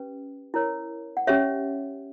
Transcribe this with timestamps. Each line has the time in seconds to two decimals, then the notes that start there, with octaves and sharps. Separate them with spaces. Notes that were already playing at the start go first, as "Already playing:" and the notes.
Already playing: C#4 G4 B4
0.54 E4 A#4 C#5
1.17 F#5
1.27 C#4 G4 C#5 E5